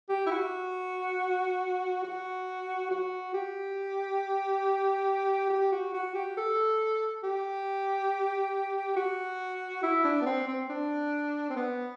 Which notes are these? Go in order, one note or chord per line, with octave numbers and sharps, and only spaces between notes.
G4
E4
F#4
F#4
F#4
G4
G4
F#4
F#4
G4
A4
G4
F#4
E4
D4
B3
C4
C4
D4
C4
B3